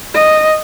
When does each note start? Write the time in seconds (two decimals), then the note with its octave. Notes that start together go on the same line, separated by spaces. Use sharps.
0.15 D#5